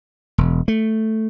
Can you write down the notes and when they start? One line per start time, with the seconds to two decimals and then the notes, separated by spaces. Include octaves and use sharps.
0.38 E1
0.68 A3